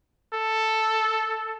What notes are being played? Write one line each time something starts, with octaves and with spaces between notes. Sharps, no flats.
A4